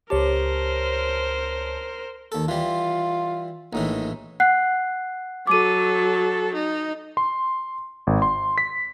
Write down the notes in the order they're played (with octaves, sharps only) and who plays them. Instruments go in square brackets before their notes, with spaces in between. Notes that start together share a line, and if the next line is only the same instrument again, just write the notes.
[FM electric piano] C#2 C#5 A5 [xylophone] G4 [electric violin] A#4 C5
[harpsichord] D#2 A4
[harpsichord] E3 G3 [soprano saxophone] F4
[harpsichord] A#1 A2 E3 [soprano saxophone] D#4
[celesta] F#5 F#6 C7
[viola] F#3 A4 [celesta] D6 D#7
[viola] D#4
[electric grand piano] C6
G#1
C6
B6